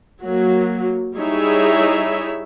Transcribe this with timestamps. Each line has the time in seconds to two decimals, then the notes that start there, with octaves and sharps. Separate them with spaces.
0.23 F#3 A#3
1.18 G3 D#4 E4 G#4 C#5 E5